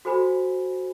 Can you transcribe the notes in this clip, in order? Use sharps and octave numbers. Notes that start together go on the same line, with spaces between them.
F#4 A4 C5 G#5 B5